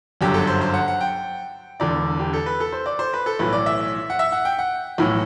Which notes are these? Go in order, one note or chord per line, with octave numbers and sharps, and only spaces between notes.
G1 F#2 D3 G4
A4
C5
C5
F#5
F#5
G5
E1 E2 D3 D5
G4
A4
B4
A4
C5
D5
C5
B4
A4
B1 A2 E3 B4
D5
E5
F#5
E5
F#5
G5
F#5
B1 A2 E3